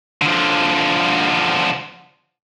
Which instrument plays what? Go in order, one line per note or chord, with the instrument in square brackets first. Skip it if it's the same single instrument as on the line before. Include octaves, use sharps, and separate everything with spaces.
[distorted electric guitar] D3 F3